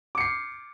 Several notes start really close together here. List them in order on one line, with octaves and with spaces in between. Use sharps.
D6 C#7 C7